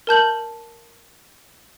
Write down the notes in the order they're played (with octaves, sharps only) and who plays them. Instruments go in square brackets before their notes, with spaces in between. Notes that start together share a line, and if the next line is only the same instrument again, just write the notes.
[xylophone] A#4 A5 G6 F#7